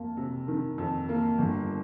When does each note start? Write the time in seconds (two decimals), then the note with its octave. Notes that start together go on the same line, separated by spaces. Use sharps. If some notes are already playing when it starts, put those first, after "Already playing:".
Already playing: F2 A#3
0.17 C3
0.48 D#3
0.78 F2
1.09 A#3
1.38 G1